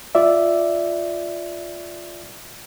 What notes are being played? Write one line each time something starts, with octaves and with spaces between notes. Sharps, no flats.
F4 D5 E5